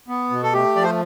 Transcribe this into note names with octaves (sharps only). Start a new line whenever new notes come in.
B3
B2
A4
A3 G4
F3 D5
C5